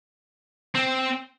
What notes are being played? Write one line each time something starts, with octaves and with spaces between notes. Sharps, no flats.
C4